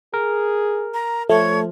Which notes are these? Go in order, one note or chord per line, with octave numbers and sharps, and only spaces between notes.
G#4 A#4
A#5
F3 A3 A4 C#5